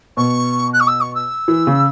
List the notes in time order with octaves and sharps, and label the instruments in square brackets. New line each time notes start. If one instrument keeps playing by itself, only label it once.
[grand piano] B2 [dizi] C#6
[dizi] F#6
C#6
E6
C#6
E6
[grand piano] E3
C#3